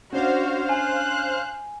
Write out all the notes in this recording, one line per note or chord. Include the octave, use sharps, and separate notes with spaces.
C#4 D4 F#4 C5 F5
G#5 F#6